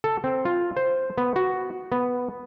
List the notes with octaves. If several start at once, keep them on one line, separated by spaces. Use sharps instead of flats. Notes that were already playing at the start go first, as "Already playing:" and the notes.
A4
C4
F4
C5
B3
F#4
B3